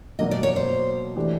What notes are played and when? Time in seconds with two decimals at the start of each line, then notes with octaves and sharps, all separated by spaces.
0.19 B2 F#3 A#3 D4 D#5
0.31 D5
0.43 C#5
0.56 C5
1.16 E3 A3 D4 G4